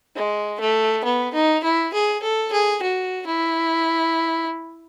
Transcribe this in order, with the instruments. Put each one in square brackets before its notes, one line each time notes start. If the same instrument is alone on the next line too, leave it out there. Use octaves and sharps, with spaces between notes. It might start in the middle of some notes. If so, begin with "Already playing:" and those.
[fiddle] G#3
A3
B3
D#4
E4
G#4
A4
G#4
F#4
E4